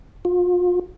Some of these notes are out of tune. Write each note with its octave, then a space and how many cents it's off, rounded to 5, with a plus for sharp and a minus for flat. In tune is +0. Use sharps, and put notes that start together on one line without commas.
F4 +35